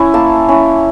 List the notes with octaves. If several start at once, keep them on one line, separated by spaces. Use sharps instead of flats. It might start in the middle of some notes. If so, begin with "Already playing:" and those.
Already playing: C#4 E4
A#3 A5
C#4 E4